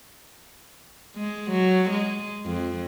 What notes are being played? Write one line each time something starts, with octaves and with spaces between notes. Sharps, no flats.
G#3
F#3
G#3
F2